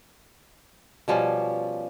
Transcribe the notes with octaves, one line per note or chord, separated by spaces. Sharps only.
B2 F3 G3 C#4